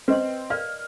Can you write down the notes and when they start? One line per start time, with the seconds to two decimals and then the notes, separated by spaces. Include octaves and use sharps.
0.08 C4 B4 D#5 C6
0.50 A#4 D5 F5 F6